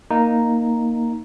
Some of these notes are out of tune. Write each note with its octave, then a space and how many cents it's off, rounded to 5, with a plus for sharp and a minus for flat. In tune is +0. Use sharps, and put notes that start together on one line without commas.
A#3 +0 D#4 +0 A#5 -5